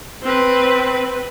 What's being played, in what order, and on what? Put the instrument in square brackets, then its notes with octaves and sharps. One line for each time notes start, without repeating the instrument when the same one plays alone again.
[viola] C4 B4